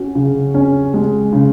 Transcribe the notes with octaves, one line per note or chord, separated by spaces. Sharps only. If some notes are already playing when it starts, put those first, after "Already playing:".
Already playing: C#4 F#4
C#3
C#4
G#3
C#3